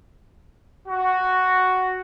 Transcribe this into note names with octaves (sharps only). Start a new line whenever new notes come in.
F#4